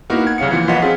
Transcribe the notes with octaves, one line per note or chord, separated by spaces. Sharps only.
A#3 B3 D#4 E4 F#4 A#4
F#5 G#6
C2 C#3 C#4 F5 C#7
E3 F3 A#3 B3 F4
B1 F4 B4 D#5 F#5 B6
C4 C#4 F4 G#4